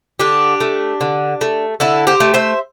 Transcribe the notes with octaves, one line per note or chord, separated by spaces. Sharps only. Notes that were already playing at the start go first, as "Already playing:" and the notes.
D3 D4 G4
A3
D3
A3
D3 E4 A4
G4 C5
A3
C5 E5